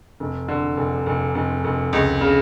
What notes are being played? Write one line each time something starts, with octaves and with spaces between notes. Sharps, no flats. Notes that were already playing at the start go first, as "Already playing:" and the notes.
F1
D3
F1
F1
F1
F1
C#2
C#3